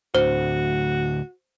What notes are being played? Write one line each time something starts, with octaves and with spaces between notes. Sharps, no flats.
D2 A2 D3 F#4 C5